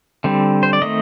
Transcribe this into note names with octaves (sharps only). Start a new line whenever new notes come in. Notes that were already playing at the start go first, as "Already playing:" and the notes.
D3 G3 C4
C5
D5
D#3 A3 C4 D#5